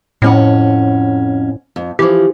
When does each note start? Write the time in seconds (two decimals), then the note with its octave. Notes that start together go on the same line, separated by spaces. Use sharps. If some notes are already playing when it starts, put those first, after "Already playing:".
0.22 F2 A2 C#4 F#5
1.76 F2
1.99 E3 F3 G4